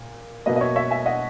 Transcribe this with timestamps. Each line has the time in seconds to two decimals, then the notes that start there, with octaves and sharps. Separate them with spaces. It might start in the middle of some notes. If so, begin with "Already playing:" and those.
Already playing: A#2
0.46 B2 F#3 A#3 B4 D#5
0.56 D#5
0.61 C#5 E5
0.76 C#5 E5
0.91 E5 G#5
1.06 D#5 F#5